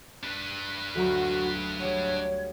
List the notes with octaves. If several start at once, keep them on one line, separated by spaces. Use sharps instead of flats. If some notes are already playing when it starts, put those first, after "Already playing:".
D4 B4
D2 F#3 F#4 A#5
G3 F#4 C#5